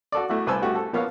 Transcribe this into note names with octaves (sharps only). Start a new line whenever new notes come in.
F#4 A4 D5
A3 E4 F#4
C2 B4 C5 G#5 A5 E6
A3 F#4 G4
A4
F3 A#3 B3 C#5 F5